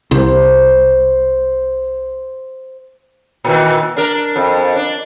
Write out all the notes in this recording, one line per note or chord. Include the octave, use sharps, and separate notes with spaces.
C2 C5
A#2 D#3 E3
D4 A#4
F2
D4